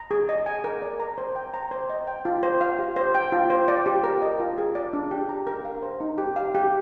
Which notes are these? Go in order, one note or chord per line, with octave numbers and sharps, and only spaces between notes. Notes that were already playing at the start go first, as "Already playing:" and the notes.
Already playing: A#5
G#4
D#5
G#5
A#4
D5
A#5
C5
G5
A#5
C5
D#5
G5
F4
C5
F5
G4
C5
G5
F4
C5
D5
G4
A#4
D#5
F4
G#4
D5
D4
G4
A#5
A#4
F5
C5
D#4
G4
F5
G4